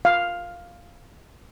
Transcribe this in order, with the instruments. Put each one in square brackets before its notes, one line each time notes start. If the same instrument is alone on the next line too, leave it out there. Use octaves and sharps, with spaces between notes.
[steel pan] F5